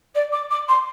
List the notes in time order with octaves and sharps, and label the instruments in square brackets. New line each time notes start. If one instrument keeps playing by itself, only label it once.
[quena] D5
D6
D6
C6